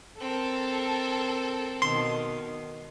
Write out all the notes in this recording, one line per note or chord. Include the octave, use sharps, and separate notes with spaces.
C4 A4 A#4
B2 D#3 C6